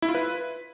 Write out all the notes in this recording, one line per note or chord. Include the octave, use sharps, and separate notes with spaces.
E4
F4
B4